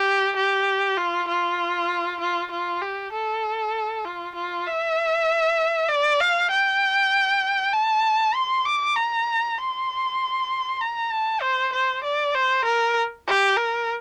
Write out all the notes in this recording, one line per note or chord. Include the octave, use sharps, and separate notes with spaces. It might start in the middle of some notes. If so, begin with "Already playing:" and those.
Already playing: G4
G4
F4
F4
F4
F4
G4
A4
F4
F4
E5
D5
F5
G5
A5
C6
D6
A#5
C6
A#5
A5
C5
C5
D5
C5
A#4
G4
A#4